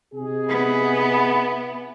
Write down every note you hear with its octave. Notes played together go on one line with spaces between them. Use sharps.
C3 D#4 G#4
B3 E4